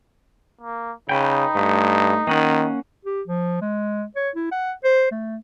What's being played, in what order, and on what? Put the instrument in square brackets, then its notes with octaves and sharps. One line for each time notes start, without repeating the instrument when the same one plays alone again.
[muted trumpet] A#3
[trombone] C#3 [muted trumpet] D#4 [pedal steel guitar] B4 G5
[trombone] G2 [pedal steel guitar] A3
[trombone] D#3 [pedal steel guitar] A#3 C#4 F#5
[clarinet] G4
F3
G#3
C#5
E4
F#5
C5
A3